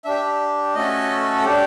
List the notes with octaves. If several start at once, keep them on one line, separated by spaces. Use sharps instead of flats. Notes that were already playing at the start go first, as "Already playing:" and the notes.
D4 G4 E5
A3 C#4 F#4 A4 D#5
D4 G4